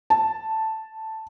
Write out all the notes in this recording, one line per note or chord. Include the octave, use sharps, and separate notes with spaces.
A5